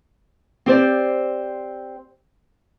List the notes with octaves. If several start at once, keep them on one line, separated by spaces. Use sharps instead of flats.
C4 G4 C5 D5